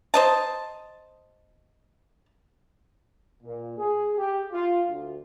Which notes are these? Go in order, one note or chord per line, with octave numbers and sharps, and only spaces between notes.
C5 D#5 A5
A#2
G#4
G4
F4
D2